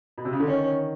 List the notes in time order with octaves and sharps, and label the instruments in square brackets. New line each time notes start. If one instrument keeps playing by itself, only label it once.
[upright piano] B2
C3
C#3
D3
[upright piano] D#3 [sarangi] C#4